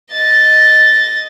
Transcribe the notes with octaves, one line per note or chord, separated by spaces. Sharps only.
D#5 A6